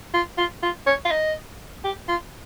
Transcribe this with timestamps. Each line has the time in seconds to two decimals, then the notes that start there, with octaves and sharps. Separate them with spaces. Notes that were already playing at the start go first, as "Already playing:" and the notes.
0.14 F4
0.38 F4
0.63 F4
0.87 C#5
1.05 F5
1.11 D#5
1.84 G4
2.08 F4